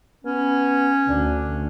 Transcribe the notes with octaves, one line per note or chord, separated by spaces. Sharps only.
B3 C#4
D2 D4